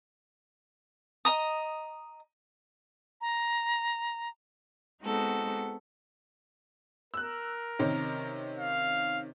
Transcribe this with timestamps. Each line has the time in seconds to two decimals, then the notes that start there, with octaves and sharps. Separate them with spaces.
1.25 D#5 A#5 D#6
3.21 A#5
5.02 G#3 B3 C4 D#4 F#4 A4
7.14 A#4 E6 F#6
7.79 C3 D#3 C#4
8.59 F5